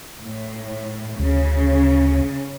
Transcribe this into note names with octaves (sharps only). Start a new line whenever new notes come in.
A2
D2 C#3